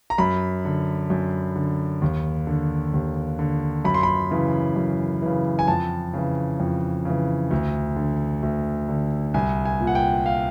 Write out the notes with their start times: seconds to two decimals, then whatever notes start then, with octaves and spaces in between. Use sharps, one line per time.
0.10 A#5
0.18 F#2 B5
0.65 D3
1.10 F#2
1.56 D3
2.02 D#2
2.47 D3
2.94 D#2
3.39 D3
3.85 F#2 B5
3.94 C6
4.03 B5
4.31 C#3 E3
4.76 F#2
5.22 C#3 E3
5.59 G#5
5.68 F2 A5
6.14 C#3 E3
6.60 F2
7.05 C#3 E3
7.51 D2
7.96 D3
8.43 D2
8.89 D3
9.34 C2 G#5
9.65 G#5
9.80 A#2
9.87 F#5
9.95 G5
10.26 F5